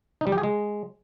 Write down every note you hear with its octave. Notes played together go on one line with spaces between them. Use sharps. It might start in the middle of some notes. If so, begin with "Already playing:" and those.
D#4
G3
G4
G#4
G#3